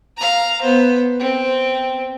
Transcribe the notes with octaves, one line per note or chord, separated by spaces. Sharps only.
F5 A#5
B3 C5
C4